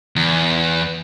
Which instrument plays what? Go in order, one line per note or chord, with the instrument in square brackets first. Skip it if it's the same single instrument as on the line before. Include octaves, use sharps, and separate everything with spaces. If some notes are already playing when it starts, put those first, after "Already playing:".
[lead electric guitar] E2